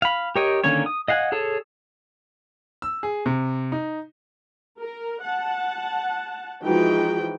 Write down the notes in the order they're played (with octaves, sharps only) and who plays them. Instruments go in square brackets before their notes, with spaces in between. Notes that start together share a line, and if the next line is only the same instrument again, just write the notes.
[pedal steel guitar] F5 B5
G4 A#4 C#5 D#5 G5
D3 D#3 A#3 C#4 C#5
D#6
D#5 F5 F#5 G#5
G#4 A4 C#5 A5
[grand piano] E6
G#4
C3
D#4
[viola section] A#4
F#5 A5
E3 F3 G#3 D#4 F#4 G5